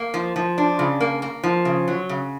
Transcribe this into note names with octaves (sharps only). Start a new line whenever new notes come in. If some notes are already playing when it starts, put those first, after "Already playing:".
Already playing: A#3
F3
F3
D4
C#3
A#3
A#3
F3
C#3
F#3
C#3